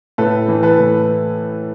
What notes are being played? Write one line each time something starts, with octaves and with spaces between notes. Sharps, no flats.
A2 A4 B4
E3
A4 B4
A2